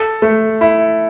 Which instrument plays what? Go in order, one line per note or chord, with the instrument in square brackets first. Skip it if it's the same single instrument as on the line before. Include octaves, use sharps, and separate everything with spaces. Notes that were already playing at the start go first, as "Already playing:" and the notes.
Already playing: [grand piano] A4
A3
E4